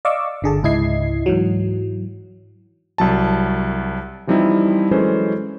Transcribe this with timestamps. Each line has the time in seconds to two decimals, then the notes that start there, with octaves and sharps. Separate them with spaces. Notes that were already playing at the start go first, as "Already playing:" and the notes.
0.05 D5 D#5 F5 C#6 D6 E6
0.42 G1 D3 G#4 A5
0.63 C#2 G#2 E4 D#5 G#6 C7
1.26 G#2 E3 F#3
2.98 C2 F#3 A5
4.27 E3 F3 G3 C4 D#4 E4
4.91 E3 F#3 G#3 C#4 A4 C5